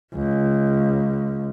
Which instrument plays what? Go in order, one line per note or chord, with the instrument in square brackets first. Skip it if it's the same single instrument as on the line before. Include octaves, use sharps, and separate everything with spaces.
[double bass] C#2